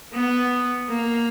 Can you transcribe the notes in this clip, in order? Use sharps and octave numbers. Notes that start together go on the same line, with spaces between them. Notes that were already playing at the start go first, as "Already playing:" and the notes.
B3
A#3